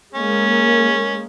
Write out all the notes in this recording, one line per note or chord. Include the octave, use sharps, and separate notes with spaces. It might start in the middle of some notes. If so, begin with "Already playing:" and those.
G#3 A#3 C#4